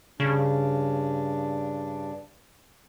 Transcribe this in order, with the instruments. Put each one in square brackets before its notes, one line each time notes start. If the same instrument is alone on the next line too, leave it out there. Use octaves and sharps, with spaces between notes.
[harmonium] G2 D4 [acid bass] C#3